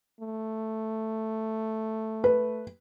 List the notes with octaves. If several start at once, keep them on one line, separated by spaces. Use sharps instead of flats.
A3
B4